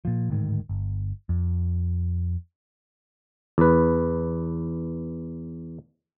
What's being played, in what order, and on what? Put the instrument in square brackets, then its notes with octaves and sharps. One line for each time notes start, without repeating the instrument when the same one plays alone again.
[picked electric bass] A#2 F3
D1 D2 G#2 D#3
G1
F2
[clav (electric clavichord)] E2 B4